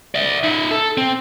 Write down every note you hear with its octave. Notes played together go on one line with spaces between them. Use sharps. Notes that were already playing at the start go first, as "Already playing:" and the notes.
D5 E5
D#4 E5
A4
C4